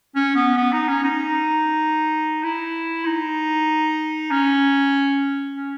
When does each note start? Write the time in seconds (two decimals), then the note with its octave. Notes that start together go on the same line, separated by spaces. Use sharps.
0.15 C#4
0.36 B3
0.57 B3
0.72 D#4
0.88 C#4
1.03 D#4
2.43 E4
3.05 D#4
4.31 C#4
5.55 C#4